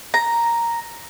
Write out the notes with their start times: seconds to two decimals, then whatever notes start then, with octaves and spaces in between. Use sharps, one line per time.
0.14 A#5